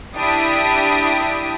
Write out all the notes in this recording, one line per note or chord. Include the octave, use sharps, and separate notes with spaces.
D4 E4 G4 D#6 D7